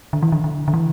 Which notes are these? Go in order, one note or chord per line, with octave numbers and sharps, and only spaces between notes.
D3
E3
D3
D3
D3
E3